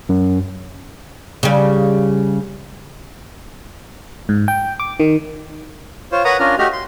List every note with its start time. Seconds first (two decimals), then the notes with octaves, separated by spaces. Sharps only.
0.09 F#2
1.43 C#3 G3
4.29 G#2
4.48 G5
4.80 D6
5.00 D#3
6.12 F4 C5 C#5
6.25 A#4 B4 C#5 F#5 A#5 D#6
6.40 C#4 D4 F4 A#4 F6
6.59 A3 F#4 G4 D#5 F6
6.72 C6